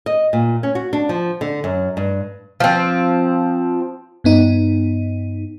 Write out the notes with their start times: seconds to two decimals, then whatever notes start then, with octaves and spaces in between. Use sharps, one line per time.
0.06 D#5
0.33 A#2
0.63 C#4
0.75 F#4
0.93 D4
1.09 F3
1.41 D3
1.64 F#2
1.97 G2
2.60 F3 C4
4.24 G2 B3 D#4